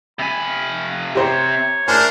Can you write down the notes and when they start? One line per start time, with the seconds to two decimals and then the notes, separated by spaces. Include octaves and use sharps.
0.19 C3 G#5 B5
1.15 G4 C5 C#5 A#5
1.88 A3 D4 A#4 C5 G#5 A5